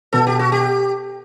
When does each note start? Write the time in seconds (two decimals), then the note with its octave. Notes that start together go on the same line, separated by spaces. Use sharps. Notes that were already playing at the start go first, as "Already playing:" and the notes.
0.13 B2 A4
0.27 G4
0.39 F#4
0.52 G4